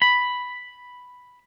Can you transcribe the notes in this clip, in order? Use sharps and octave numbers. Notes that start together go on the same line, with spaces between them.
B5